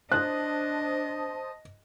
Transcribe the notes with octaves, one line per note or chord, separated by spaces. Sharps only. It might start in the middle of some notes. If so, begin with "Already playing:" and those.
D4 C5 D#5 A5 D#6 F#6